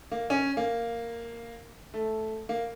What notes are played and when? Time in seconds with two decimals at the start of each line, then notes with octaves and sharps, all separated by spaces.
0.11 A#3
0.30 C#4
0.57 A#3
1.94 A3
2.49 A#3